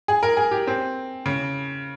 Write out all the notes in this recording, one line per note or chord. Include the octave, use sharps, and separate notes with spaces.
G#4
A#4
G#4
G4
C4
C#3